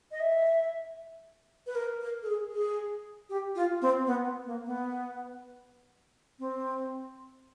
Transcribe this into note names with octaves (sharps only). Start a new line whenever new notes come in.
D#5
E5
B4
A#4
A#4
A4
G#4
G#4
G4
F4
C4
B3
A#3
B3
C4